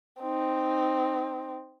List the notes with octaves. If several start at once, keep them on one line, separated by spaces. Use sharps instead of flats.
C4 D#4